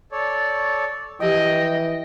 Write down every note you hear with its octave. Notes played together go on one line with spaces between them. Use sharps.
A4 C#5 D5
E3 F3 G4 D#5 G5